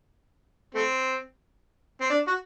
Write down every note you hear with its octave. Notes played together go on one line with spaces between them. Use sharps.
A3 C4
C4
D4
F#4